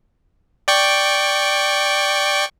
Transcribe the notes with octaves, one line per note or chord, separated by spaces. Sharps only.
D5 G5 C#6